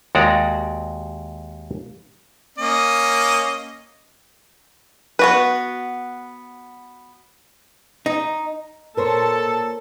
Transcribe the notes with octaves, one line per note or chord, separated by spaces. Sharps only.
D#2 G#3 F#4 D5 A#5
A#3 C#4 D#5
B3 F#4 B4
D#4
A#2 A4 A#4 C5 C#5 A5